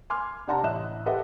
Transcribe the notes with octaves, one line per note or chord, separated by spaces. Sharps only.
G#5 C6 D6 F6
C3 D4 F#5 A5 A#5
A1 D#5 E5 F#6 E7
G4 A4 B4 D#5 E5 F#5